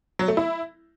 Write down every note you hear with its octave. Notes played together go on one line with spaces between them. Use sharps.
F#3
A3
E4